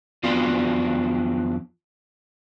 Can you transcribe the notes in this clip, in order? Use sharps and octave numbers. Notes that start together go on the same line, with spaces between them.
F2 F#3 B3 D4 F4 D5